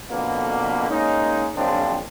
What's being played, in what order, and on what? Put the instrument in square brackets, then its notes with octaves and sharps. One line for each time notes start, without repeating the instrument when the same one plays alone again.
[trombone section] F2 B2 D3 A#3 B3
G#3 A#3 C#4 D#4
A#1 F#2 C#3 F3 C4 D4